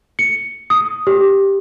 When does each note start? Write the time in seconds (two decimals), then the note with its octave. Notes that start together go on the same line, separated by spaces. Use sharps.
0.19 C#7
0.70 D#6
1.07 G4